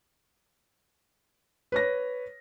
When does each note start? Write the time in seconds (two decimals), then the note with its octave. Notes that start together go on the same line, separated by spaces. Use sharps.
1.72 B4 C#5 A#6